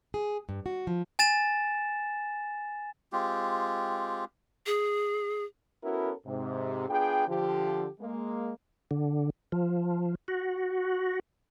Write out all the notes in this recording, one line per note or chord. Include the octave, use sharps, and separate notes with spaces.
G#4
G2
F#4
F3
G#5 A6 E7
G#3 C4 F4 G4
G#4
B3 C#4 E4 F#4 A4 A#4
G#2 C3
B3 D4 F4 G#4 G5
D3 F3 G4
G#3 A#3
D3
F3
F#4